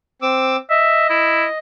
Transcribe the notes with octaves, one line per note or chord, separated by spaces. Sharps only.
C4 D6 E6
D#5 E5
E4